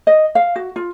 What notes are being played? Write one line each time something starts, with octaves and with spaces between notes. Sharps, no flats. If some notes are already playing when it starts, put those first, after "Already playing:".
D#5
F5
F#4
F4